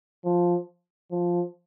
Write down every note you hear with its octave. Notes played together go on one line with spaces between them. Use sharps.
F3
F3